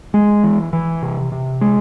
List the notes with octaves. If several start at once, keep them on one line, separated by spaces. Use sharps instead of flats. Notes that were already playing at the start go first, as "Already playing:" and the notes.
G#3
E3
E3
C3
C3
G#3